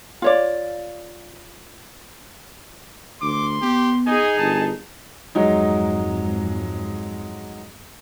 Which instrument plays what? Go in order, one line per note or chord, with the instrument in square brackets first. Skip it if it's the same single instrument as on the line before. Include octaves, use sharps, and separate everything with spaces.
[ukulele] F4 C#5 D5
[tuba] D2 [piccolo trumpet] C6 [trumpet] D6
[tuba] B3 [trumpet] G4
[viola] D#4 G#4 [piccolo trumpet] D#5 [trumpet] G#5
[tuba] G1 [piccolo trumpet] A5
[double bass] F2 G#2 [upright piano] F#3 G#3 D#4